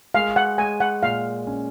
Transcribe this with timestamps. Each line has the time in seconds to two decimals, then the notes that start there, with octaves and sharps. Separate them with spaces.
0.14 G#3 F5
0.36 F#5
0.58 G#3 G#5
0.80 F#5
1.02 A#2 F5
1.47 C#4